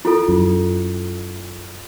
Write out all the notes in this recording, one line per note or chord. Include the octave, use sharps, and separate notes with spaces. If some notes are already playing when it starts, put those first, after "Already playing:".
E4 F4 A4
F#2